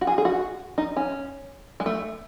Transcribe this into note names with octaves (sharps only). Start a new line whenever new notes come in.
F#4
G#4
G#4
F#4
D#4
C#4
G#3
A3